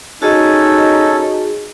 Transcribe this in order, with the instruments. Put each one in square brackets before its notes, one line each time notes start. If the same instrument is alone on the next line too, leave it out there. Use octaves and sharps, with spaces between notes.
[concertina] C#4 A4 [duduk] D#4 [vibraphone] F#4 G#4 D#5